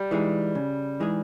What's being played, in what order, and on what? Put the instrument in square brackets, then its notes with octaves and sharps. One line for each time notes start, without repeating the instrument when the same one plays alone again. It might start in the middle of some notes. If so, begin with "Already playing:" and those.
Already playing: [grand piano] G3
[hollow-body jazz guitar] E3 G#3 D#4 G#4
C#3
E3 G#3 D#4 G#4